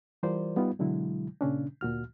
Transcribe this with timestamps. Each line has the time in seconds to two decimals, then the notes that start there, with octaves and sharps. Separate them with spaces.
0.23 E3 G3 F4 A#4 C5 D5
0.56 G3 B3 D#4 F4
0.79 B2 D3 F#3 G#3 E4
1.41 A#2 C#3 C#4 D4
1.81 D2 A#2 F#4 F6